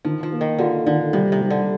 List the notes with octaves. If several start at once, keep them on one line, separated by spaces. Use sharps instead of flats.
D#3 F3
F3
A#3
D#3
D3 F4
D3 D#3
C3 G3
C3
G3
D3